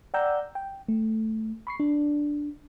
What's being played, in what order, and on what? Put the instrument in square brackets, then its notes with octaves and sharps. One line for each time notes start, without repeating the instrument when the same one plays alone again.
[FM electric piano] D5 F#5 G5 A#5 E6 G6
G5
A3
B5 C#6 C7
D4